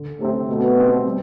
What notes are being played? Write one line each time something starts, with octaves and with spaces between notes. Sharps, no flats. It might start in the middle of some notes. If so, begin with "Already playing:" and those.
Already playing: D3
A2 C3 A3 C4
B2 A3
C4 G4
G3